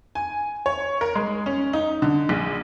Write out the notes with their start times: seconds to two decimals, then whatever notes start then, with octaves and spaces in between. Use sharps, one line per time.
0.15 G#5
0.66 C#5
1.01 A#4
1.15 G#3
1.46 C#4
1.73 D#4
2.02 D3
2.29 A#1